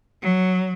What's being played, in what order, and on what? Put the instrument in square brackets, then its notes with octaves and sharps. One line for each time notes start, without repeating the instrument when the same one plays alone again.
[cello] F#3